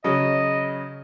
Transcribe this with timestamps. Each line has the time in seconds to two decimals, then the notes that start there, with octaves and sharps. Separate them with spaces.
0.04 C#3 F#3 D#5